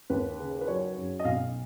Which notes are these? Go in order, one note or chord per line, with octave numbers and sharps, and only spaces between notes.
D#2 B4
C#3
B4
F#3 C#5
F#2
D#5
B1 F5